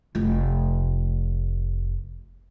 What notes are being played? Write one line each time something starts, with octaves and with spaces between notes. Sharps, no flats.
F1 F4